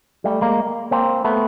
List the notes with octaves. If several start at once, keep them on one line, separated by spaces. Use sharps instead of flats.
G3 A3
G#3 A#3
A#3 C4
A3 B3